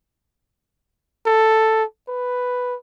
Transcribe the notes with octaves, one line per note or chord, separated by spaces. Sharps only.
A4
B4